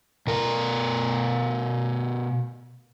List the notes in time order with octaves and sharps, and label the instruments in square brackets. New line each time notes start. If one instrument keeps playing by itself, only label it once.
[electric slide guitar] B2 A#4